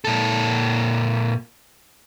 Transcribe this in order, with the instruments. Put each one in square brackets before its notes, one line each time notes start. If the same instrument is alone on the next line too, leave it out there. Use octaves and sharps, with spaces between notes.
[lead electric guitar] A#2 A4